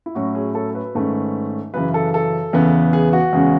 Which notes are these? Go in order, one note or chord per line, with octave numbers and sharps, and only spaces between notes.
E4
A2 F#3 C#4 F#4
G#4
A4
B4
G#2 D#3 A3 C#4
F#2 C#3 E3 B4
A4
A4
E2 C#3 E3 B3
G#4
F#4
E2 C#3 G#3 C#4